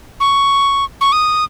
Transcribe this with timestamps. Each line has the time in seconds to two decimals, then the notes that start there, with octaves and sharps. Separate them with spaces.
0.20 C#6
1.01 C#6
1.12 D#6